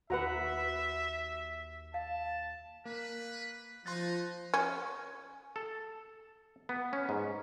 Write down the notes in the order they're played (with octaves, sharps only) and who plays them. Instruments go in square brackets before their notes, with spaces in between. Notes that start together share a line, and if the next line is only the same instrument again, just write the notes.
[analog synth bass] D#2 [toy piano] F#4 [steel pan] B4 F#5 A#5 [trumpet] E5
[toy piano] F5 [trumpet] A5
[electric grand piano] A#3 [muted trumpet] B4
[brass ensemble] F3 [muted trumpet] D#4 [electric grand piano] C6 F#6 A6
[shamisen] C#4
[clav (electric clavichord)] A4
B3
C#4
G#2